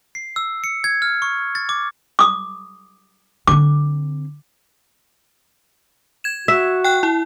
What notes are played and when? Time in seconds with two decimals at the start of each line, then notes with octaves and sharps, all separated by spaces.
0.15 C7
0.36 E6
0.64 C#7
0.84 G#6
1.02 F6
1.22 C#6
1.55 A6
1.69 D6
2.19 D6 D#6
3.47 D3 C4 D6
6.24 G#6 E7
6.48 F#4 E5
6.84 G5 F#6
7.03 E4